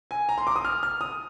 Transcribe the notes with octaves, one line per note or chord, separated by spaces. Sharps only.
G#5
A#5
C6
D6
D#6
F6
F6
D#6